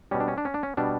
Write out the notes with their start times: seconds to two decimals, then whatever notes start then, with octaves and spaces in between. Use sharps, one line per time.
0.11 B2 G3 C#4
0.20 D4
0.28 C#4
0.38 D4
0.45 C#4
0.54 D4
0.63 C#4
0.77 B2 G3 D4